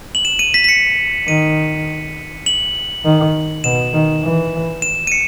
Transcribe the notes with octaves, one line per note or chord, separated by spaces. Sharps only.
F#7
E7
D#7
B6
B6
C#7
D#3 D#7
F#7
D#3
B2 E7
D#3
E3
E7
D#7
C#7